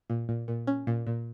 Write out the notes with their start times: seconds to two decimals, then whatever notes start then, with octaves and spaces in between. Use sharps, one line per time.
0.10 A#2
0.29 A#2
0.48 A#2
0.67 C#4
0.87 A#2
1.07 A#2